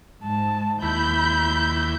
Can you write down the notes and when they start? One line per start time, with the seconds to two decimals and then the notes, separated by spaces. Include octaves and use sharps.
0.24 G#2 A5
0.82 D#2 E4 B5 G6